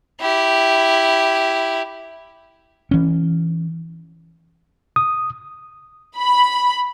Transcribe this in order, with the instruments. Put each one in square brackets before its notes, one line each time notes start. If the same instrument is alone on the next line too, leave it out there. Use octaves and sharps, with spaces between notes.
[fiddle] E4 G4
[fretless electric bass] E3 C#4
[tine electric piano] D#6
[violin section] B5